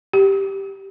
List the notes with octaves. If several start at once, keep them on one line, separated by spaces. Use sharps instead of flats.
G4